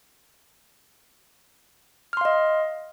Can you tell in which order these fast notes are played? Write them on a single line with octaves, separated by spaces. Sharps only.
F6 C6 F5 D#5